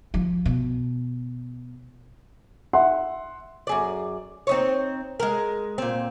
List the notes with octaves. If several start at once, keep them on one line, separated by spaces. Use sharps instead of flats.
F3
B2
E5 F#5 C6
F#2 G#4 D5
C4 D#4 C#5
G#3 A#4
A#2 C4